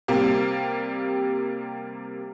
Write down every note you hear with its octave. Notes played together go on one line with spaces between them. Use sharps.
C3 G3 A#3